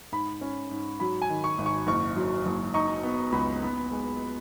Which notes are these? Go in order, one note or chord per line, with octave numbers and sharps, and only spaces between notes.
G#2 B5
C#4
G#2
F#3 B5
G#5
D#3
C#6
G#1
C#6
F#1 C#6
F#3
F#1
D#4 C#6
B3
C#2 B5
B3
G#3